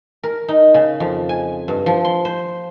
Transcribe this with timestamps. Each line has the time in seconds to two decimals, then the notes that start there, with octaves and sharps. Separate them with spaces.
0.23 A#4
0.48 D#4
0.74 C#3
1.00 F2
1.29 G#5
1.68 G2
1.86 F3
2.04 C6
2.25 C5